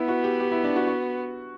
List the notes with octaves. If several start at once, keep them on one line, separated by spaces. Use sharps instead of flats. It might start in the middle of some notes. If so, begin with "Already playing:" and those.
Already playing: B3 E4
F#4
G4
G4
E4
D4
F#4
F#4